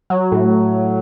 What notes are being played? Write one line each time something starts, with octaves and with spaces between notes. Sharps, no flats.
F#3
A2